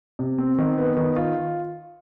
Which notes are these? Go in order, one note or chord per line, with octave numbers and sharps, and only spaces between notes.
C3
C4
D#3
B3
D#3
F4